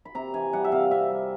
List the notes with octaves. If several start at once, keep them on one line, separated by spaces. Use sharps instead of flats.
B5
C3 A#5
E3 G#5
G3 F#5
E5
C3 F5
C3 E5
G3